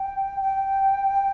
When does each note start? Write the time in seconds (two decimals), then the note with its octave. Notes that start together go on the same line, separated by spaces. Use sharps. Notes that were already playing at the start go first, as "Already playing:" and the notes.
Already playing: G5
0.41 G5